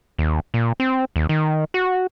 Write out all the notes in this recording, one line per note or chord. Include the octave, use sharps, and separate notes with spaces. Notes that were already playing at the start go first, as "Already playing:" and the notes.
D#2
A#2
C4
D#2
D#3
F#4